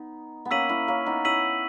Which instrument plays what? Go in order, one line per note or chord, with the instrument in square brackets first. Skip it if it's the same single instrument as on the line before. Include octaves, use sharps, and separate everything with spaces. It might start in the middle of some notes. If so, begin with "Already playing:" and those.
Already playing: [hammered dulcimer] B3 D#4
B3
[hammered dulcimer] A#3 C#4 [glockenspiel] E6 B6 D#7 F#7
[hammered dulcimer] C#4 E4
A#3 C#4
B3 D#4
[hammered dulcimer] C#4 E4 [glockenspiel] E6 B6 D#7 F#7